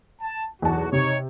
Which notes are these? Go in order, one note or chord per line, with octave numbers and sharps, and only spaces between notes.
A5
B1 E2 F#4 A5
C3 D#4 C#5